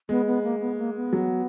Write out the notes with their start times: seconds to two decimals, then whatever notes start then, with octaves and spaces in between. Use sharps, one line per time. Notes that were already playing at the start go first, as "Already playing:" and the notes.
0.09 G#3 B3
0.27 B3
0.44 A#3
0.60 B3
0.78 A#3
0.96 B3
1.13 F#3